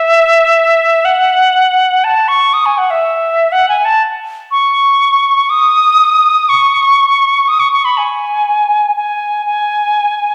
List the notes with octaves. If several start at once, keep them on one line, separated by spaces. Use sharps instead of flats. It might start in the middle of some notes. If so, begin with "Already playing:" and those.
Already playing: E5
F#5
A5
C#6
D#6
G#5
F#5
E5
F#5
G#5
A5
C#6
D#6
C#6
D#6
C#6
C#6
B5
G#5
G#5
G#5